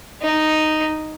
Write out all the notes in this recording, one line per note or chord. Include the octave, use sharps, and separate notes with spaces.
D#4